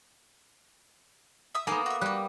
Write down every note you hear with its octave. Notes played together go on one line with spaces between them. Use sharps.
E5 D#6 E6
A#3 B3 D#4 A#4 G#5
F#4 E5
G3 F#4 F#6